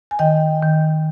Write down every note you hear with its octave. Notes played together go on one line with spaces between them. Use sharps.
G#5
D#3 D#5 G5
D#3